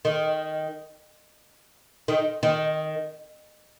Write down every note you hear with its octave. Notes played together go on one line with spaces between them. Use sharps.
D#3
D#3
D#3